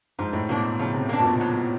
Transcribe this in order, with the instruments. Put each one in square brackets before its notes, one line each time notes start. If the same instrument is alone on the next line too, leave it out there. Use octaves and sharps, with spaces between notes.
[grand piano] G#2 [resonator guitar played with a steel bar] F3
[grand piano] A2
[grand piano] B2 [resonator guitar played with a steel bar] A#3 D4
[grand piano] C#3 [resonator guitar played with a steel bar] F3
[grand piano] C3
[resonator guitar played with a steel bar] A#3 D4
[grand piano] A#2
B2
[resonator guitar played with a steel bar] F#3